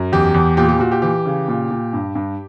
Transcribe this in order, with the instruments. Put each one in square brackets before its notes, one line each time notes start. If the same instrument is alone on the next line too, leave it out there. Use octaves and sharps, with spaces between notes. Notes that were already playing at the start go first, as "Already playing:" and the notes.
Already playing: [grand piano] F#2
E2 G4
E2
A#2 G4
G4
A#2 F#4
G4
E3 G4
C#3
A#2
A#2
G2
G2